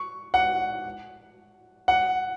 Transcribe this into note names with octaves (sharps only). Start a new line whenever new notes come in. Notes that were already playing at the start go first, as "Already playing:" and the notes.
Already playing: C#6
F#5
F#5